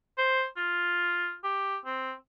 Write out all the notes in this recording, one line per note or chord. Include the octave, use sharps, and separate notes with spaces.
C5
F4
G4
C4